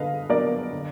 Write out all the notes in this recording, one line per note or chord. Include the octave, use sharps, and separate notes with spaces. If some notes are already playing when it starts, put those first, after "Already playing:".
Already playing: D3 B4 D#5 F5
F#3 B3 D4 A#4 D5
D3